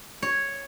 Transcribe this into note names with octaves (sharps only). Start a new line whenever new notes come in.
C#5